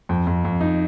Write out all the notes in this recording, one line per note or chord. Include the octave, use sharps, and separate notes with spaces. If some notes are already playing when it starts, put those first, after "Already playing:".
F2
F2
F2
D#4